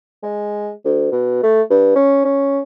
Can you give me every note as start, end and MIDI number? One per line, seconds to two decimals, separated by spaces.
0.23 0.70 56
0.85 1.09 38
1.12 1.41 47
1.43 1.62 57
1.70 1.92 43
1.96 2.21 61
2.25 2.61 61